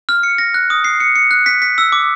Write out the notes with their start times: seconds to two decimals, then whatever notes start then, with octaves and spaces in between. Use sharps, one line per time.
0.09 F6
0.23 C#7
0.38 A#6
0.54 F#6
0.70 D#6
0.84 C7
1.00 C#7
1.15 C#7
1.31 F#6
1.46 B6
1.62 B6
1.78 E6
1.92 D6